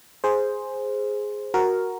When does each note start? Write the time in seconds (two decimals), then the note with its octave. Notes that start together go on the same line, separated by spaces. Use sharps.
0.24 G#4 C5
1.54 F#4 A#4